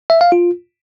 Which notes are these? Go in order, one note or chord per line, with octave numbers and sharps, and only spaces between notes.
E5
F5
F4